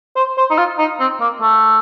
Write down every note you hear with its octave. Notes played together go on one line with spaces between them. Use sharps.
C5
C5
D#4
F4
D#4
C4
A#3
A3